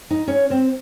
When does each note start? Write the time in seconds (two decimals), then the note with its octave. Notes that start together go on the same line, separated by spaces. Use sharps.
0.10 D#4 D#5
0.27 C#4 C#5
0.50 C4 C5